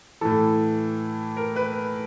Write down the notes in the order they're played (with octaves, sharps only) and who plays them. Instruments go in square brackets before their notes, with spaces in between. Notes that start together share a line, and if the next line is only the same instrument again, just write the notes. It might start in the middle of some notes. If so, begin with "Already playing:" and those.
[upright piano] A2 E3 A4
A#4
B4